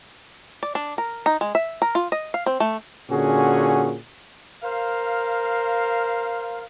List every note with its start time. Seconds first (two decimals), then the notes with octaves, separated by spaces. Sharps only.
0.63 D5
0.75 D4
0.98 A#4
1.26 D#4
1.41 G#3
1.55 E5
1.82 A#4
1.95 F4
2.12 D#5
2.34 F5
2.46 C4
2.60 A3
3.10 A#2 D3 C#4 F#4 G#4
4.63 A#4 C5 F5